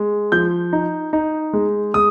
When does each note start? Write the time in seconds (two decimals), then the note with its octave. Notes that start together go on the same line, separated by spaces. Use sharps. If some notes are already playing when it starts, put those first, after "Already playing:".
Already playing: G#3
0.32 F3 G6
0.73 D#4
1.13 D#4
1.53 G#3
1.94 G#3 D#6